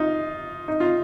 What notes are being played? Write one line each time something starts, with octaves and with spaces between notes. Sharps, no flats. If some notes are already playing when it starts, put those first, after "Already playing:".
Already playing: D#4 F4
D#4
F4